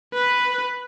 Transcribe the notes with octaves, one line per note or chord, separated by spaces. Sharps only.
B4